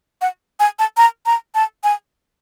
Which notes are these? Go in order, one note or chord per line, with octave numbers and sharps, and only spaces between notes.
F#5
G#5
A5
A#5
A#5
A5
G#5